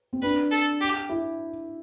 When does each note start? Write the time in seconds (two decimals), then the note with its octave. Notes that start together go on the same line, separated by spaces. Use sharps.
0.13 C4
0.22 D4 B4
0.51 A4
0.81 G4
1.09 E4